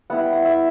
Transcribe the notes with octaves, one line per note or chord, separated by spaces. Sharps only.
G3 B3 E4 F#5
G5
F#5
E5